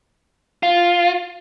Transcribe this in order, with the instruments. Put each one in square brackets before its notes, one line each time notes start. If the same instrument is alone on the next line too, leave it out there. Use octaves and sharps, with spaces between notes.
[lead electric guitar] F4